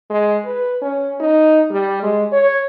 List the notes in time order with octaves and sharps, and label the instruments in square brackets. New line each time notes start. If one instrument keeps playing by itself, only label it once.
[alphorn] G#3
B4
C#4
D#4
G3
G#3
C#5